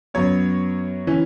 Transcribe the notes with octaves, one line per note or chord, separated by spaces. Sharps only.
F#2 F#3 B3 C#5
E3 C#4